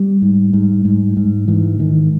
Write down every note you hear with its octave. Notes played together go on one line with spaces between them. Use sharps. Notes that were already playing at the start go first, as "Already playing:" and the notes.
Already playing: G3
G#2
G#2
G#2
G#2
G#2 E3
G#2 D#3